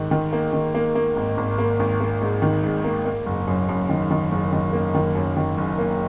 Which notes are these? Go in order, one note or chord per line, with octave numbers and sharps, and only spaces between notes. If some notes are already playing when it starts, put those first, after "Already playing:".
Already playing: G#2 D#3
D#3
A#3
D#3
A#3
A#3
G#1
G#1
A#3
G#1
A#3
G#2
D#3
G#2
A#3
A#3
F#1
F#2
F#2
D#3
D#3
F#1
D#3
A#3
D#3
F#2
D#3
F#1
A#3